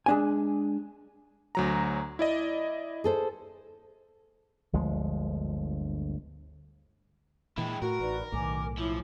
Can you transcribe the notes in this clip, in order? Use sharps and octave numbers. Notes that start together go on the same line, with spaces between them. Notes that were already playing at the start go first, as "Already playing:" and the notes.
G#3 D4 G#5
D2 F#3 A#5
E4 D5 D#5
G#4 A4 C5
G1 D2 F3 G#3
A#2 E3 G#3 E4 G5
A2 F#4 A#4
A1 D#4 B4 D5
B1 A2 D#3 G#5 D6
F3 E4 C#5 D6